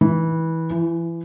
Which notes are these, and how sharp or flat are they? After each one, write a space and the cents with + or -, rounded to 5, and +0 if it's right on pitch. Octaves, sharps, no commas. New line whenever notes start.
E3 -20
E3 +25